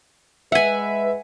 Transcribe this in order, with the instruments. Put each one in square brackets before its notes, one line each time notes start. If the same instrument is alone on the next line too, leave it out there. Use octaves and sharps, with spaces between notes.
[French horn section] G#3 B4 [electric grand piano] E5 B6 [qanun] F#5 G#5